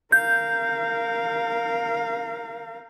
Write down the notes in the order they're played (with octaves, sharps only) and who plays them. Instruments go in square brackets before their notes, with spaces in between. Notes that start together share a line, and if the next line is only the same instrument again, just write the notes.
[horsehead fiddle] A#4 F5 [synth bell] G6